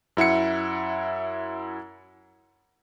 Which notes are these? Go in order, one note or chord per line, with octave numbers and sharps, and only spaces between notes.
F#2 E4 F#5 C#7